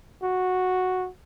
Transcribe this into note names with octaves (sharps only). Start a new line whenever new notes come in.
F#4